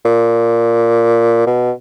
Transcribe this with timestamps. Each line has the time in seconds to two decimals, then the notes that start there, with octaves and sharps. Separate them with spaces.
0.05 A#2
1.47 B2